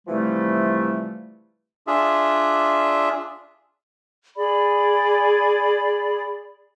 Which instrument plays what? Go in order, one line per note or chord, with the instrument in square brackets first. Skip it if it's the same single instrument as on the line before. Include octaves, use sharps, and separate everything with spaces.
[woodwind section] C3 E3 F3 G3 A3
[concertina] D4 F4 G#4 E5
[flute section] G#4 D5 B5